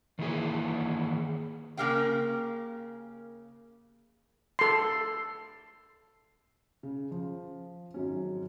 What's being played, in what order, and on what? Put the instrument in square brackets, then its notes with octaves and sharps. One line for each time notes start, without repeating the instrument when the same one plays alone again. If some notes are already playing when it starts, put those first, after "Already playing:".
[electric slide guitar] D#3 E3 A#3 G#4
[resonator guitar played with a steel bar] C#3 A#3 G4 A#4 F5 G5
[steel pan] A4 C6
[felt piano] C#3
F3
G#1 F#3 C#4